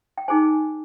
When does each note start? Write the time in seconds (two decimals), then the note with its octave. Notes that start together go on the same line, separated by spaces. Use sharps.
0.18 G5
0.28 D#4 G#4 C5 G#5